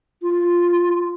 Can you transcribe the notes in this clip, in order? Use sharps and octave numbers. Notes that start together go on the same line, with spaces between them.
F4